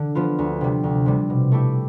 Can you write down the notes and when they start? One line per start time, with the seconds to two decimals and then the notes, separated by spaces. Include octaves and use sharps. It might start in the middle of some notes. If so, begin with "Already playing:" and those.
Already playing: D3
0.15 F3 B3 F4
0.39 D2
0.61 C3 G3
0.84 D2
1.06 C3 G3
1.30 B2
1.52 A3 E4 G4